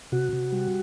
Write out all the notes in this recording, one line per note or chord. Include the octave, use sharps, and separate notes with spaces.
C3 F#4
C3
G3